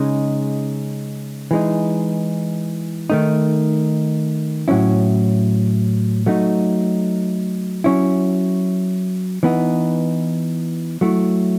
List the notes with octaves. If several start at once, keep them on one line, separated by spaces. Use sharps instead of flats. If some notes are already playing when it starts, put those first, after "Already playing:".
Already playing: C#3 G#3 D#4
E3 G#3 D#4
D#3 A3 D#4
A2 F#3 C#4 E4
F#3 A3 D#4
F#3 C#4 E4
E3 B3 D#4
F#3 A3 E4